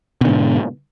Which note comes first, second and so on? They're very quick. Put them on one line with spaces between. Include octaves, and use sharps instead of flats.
B2 D3 G#2